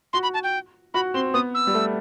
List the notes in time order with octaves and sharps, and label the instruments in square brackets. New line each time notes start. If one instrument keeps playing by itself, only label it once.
[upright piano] F#4 [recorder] C6
[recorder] B5
A5
G5
[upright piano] F#4 [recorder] B5
[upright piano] C4 [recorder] C6
[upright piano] B3 [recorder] D#6
[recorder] E6
[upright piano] G3
A3